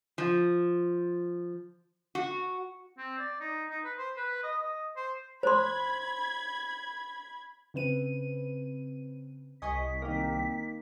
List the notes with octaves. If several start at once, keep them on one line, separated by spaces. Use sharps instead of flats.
F3
F#4
C4
D5
D#4
D#4
B4
C5
B4
D#5
D#5
C5
C5 B5 C6 G#6
C#3 C4 B4 D#7
C2 D#5 G#5 C#6 B6
D#3 A#3 C4 D#4